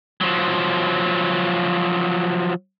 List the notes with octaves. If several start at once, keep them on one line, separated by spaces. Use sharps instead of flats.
F3 F#3